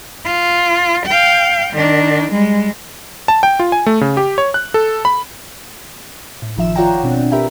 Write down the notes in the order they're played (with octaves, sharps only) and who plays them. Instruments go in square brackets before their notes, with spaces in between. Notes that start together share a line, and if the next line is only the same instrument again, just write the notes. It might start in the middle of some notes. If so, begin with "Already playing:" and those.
[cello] F4
F5 G5
D#3 D4
G3 G#3
[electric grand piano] A5
G5
F4
G#5
A3
C#3
G4
C#5
F#6
A4
B5
[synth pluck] A2
G#1 D#3 F3 E5 E7
F4 C#5 D5 F#5 G5 A#5
B2 C4 D4
G4 A#4 B4 E5 G5